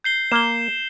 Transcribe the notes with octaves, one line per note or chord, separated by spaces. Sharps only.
G6 C7 G7
A#3 E7 G7